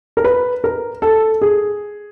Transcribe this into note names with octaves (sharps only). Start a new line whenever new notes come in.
A#4
B4
A#4
A4
G#4